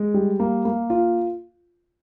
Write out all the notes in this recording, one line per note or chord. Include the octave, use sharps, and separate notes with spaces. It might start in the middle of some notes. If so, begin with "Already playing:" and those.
Already playing: G#3
G3
A#3
A#3
F4